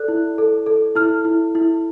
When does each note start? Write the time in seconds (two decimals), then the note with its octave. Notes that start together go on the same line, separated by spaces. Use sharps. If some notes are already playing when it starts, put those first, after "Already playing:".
Already playing: A4 D5 F#6
0.08 E4
0.38 A4
0.66 A4
0.95 E4 F6
1.25 E4
1.55 E4